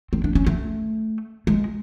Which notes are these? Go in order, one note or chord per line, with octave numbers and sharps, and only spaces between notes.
C4
D4
C#4
A3
G#3